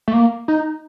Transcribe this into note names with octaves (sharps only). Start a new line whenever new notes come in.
A3
A#3
D#4